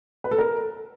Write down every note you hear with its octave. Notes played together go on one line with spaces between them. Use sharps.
B4
A4
A#4